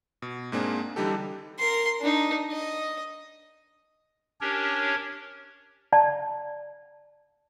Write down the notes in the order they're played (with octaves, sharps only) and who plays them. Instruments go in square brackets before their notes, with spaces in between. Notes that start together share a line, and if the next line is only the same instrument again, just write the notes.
[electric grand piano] B2
G#2 G#3 A#3 C4 D4 G#4
D3 E3 G3 D#4 G4 A4
[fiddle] A#4 C6
D4 D#4
D#5
[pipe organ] C#4 D4 G4 A#4 C#5
[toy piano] D5 A5